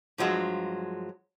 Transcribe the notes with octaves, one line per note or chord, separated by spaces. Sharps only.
G2 F3 F#3 G#3